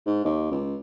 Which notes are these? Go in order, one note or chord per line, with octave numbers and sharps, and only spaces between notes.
G#2
D#2
C#2